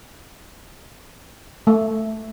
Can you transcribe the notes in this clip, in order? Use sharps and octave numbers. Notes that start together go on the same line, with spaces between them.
A3